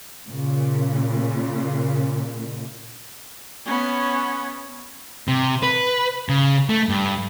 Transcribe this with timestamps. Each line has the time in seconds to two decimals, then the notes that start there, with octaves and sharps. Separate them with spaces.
0.28 A#2 C#3
3.66 B3 C#4
5.28 C3
5.63 B4
6.29 C#3
6.69 A3
6.89 G2